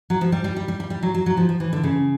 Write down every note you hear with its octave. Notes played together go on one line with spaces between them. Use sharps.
F#3
F3
G3
G3
G3
G3
G3
G3
F#3
F#3
F#3
F3
F3
E3
D3
C#3